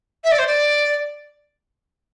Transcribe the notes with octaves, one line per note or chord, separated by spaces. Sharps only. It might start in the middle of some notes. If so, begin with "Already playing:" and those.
E5
D5
C5
D5